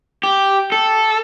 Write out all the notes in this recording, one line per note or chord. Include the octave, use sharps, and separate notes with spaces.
G4
A4